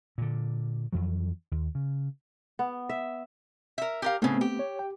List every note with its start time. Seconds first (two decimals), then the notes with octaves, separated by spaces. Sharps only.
0.18 A#2 D3
0.92 F2 E3 F#3
1.51 D#2
1.75 C#3
2.59 B3
2.89 E5
3.78 A#4 E5
4.02 G4 A#4 F5
4.22 A2 C#3 A3 B3 C4
4.41 G4
4.59 C#5
4.79 G5